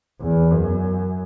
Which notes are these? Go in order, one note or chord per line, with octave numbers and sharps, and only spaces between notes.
E2
F#2